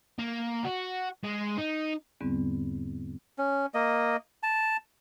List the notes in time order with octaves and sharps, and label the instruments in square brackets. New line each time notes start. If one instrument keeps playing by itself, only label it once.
[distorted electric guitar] A#3
F#4
G#3
D#4
[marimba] E2 G#2 D3 G3 B3 C4
[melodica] C#4
A#3 D#5
A5